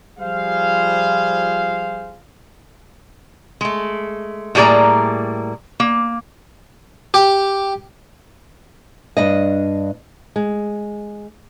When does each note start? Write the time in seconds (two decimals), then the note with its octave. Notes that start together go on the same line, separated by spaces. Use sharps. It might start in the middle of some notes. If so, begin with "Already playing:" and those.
0.19 F3 G3 F4 G#4 C5 F5
3.61 G#3 A3
4.55 A2 G3 A#3 G#4 D5 A#5
5.80 A#3
7.14 G4
9.17 G2 D4 D#5
10.36 G#3